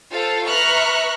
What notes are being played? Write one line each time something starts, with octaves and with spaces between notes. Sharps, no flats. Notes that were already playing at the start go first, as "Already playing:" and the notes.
F4 A4 C5 F5
B4 E5 A#5 C#6 F6 F#6